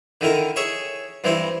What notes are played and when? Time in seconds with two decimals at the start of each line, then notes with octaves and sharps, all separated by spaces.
0.21 D3 D#3 E4 A#4 A#5
0.56 G#4 C#5 E5 D#6
1.24 G2 E3 C4 E4